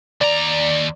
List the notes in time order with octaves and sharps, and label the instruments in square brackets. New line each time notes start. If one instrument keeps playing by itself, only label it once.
[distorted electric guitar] D#2 A#5 [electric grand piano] D5